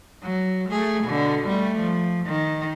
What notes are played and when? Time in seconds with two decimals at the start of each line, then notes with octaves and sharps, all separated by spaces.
0.23 F#3
0.70 A3 G#4
1.05 B2 D3
1.48 G3 A3
1.80 F3
2.26 D#3